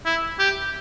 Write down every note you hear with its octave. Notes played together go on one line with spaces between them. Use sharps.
E4
G4